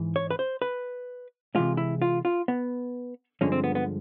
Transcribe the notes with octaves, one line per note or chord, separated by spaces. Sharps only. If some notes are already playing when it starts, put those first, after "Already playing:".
Already playing: G#2 E3 G#3
C#5
B4
C5
B4
C3 E3 G#3 F4
E4
F4
F4
B3
G2 D3 F3 G#3 C#4
C4
B3
B3